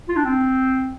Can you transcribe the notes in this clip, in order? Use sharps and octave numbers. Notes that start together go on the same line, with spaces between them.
F4
D4
C4